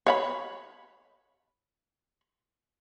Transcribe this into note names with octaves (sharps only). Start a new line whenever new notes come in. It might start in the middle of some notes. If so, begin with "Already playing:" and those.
C#5 F5 B5